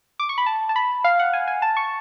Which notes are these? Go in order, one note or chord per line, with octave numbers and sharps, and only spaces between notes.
D6
C#6
B5
A5
A5
B5
F5
F#5
G#5
G#5
A5
C#6